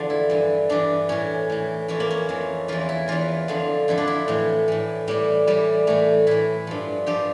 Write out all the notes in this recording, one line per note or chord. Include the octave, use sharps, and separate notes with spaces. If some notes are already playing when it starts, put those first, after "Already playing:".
Already playing: E2 D3 F3
E4
G2 E3
G2 E3 D4
A2 E3 C#4
A2 E3
F2 E3 C#4
A#3
C#4
F2 E3
E2 E3 F4
E4
E2 E3 F4
F2 D3 F3
F2 D3 F3 E4
D4
E4
A2 E3
A2 E3
A2 E3 G3
A2 E3 G3
A2 E3 A3
A2 E3 E4
G2 F3
G2 F3 G4